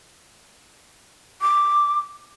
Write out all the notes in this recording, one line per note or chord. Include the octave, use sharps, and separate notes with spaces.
D6